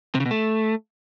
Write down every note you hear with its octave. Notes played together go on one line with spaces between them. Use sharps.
C3
C#3
B2
A3